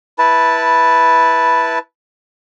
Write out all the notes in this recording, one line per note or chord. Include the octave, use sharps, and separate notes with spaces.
E4 B4 A5